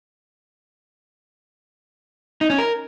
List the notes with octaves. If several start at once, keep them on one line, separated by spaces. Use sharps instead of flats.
D#4
C#4
A#4